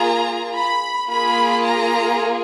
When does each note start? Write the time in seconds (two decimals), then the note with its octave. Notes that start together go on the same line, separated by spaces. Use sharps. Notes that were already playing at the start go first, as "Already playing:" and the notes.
Already playing: A#3 F4 G#4 A#5
0.55 B5
1.10 A#3 F4 G#4 B5
1.65 A#5